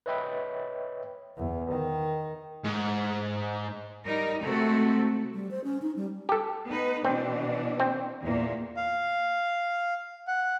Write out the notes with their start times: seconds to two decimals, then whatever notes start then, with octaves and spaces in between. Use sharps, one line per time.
0.06 B4 C#5 D#5 E5 G5 B5
1.37 E2
1.71 D#3
2.65 G#2
4.06 G3 D#4 A#4
4.43 C3 G#3 A3 C4 F#4 A4
5.34 G3
5.51 C5
5.64 C#4
5.82 D#4
5.96 G3
6.29 G4 A4
6.67 B3 D#4 B4
7.05 B2 E3 C4 D4
7.80 C4
8.21 E2 A#2 A#3
8.77 F5
10.28 F#5